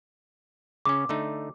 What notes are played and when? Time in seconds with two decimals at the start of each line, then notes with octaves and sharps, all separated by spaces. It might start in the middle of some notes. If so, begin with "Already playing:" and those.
0.85 C#3 C#4 D6
1.09 D3 A3 D#4